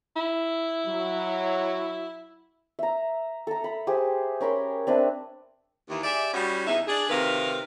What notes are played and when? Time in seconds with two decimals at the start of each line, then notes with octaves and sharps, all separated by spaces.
0.16 E4
0.87 F#3
2.79 E5 A#5
3.47 A4 A#5
3.64 B5
3.87 G4 G#4 C5
4.41 C#4 A#4 B5 C6
4.87 C4 D4 B4 E5
5.89 D#2 E3
6.03 G4 G#4 D5 E5
6.33 A2 G3 C#4 F#4
6.67 E2 D#4 E5
6.87 D4 G#4
7.10 D2 C3 D#3 A#4 B4 F5